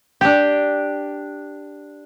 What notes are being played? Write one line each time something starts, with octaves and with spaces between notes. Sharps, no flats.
D4 G4